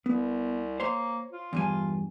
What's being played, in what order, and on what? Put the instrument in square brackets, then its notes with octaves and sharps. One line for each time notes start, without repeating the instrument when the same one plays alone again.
[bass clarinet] C2 [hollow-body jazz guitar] B3
[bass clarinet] A#3 [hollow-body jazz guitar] C5 C#5 C6
[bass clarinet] F4
[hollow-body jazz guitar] E2 G2 G#5